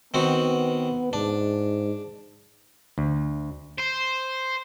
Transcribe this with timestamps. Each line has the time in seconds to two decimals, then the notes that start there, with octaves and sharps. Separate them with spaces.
0.14 D#3 B3 C4 F#4
1.13 G#2 D4
2.98 D2
3.79 C5